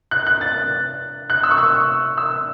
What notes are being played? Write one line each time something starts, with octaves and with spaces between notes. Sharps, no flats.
F#6
F#6
A6
F#6
E6
C#6
E6
E6